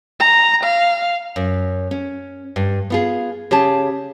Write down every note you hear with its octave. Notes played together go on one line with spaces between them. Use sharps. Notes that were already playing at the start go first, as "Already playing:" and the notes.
A#5
F5
F#2
C#4
G2
B3 F4 G#4
C#3 G4 G#4 A5